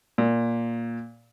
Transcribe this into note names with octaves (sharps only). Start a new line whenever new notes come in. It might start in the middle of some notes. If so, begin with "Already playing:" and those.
A#2